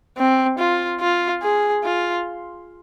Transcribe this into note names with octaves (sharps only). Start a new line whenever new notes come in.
C4
F4
F4
G#4
F4